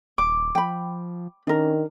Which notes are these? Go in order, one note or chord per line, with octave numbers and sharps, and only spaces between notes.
D#1 D6
F3 G5 B5
D#3 C#4 D4 A#4